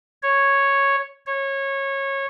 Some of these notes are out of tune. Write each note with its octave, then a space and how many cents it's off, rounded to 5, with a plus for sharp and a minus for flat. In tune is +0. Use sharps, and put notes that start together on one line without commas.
C#5 -5
C#5 -20